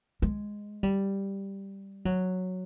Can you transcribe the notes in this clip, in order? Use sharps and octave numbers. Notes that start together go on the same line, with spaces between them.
G#3
G3
F#3